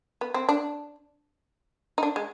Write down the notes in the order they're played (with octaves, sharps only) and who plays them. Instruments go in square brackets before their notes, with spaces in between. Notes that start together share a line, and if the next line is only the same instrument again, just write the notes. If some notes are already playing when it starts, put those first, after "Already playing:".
[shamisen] B3
C4
D4
D#4
D4
G#3